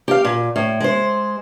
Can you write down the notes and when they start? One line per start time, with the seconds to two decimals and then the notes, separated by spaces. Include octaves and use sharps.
0.08 G4 F5
0.25 A#2
0.56 A2
0.80 G#3 C5